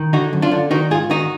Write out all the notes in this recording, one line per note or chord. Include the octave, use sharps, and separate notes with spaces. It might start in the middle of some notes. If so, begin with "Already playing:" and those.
Already playing: D#3
D3 D#4 F#4
F#2
D4 F4
D3
D#3 D#4 F#4
G#2 F4 G#4
D#3 D#4 F#4